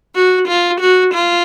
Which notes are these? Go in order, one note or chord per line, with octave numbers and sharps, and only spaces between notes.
F#4
F4
F#4
F4